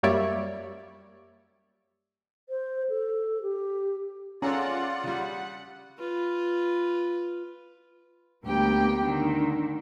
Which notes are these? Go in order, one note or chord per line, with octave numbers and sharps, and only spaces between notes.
F#2 G3 A#3 C#5 D5 E5
C5
A4
G4
C#4 F4 G#4 A4 C#5 D5 F#5 A#5
C#3 G3
F4 B4
D2 G3 A#3 B3 G4 G5
D3 D#3